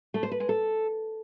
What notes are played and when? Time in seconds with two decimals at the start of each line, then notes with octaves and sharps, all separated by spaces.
0.14 A3
0.23 C5
0.32 B4
0.40 G#3
0.49 A4